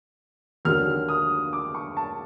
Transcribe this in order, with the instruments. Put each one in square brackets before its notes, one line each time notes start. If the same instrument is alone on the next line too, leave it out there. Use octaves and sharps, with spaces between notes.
[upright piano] D#2 D3 F#3 F6
D#6
D6
C#6
A5